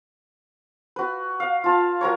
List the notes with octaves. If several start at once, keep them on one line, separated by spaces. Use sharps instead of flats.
F#4 B4
F5
F4 A5
F#3 A#4 C#5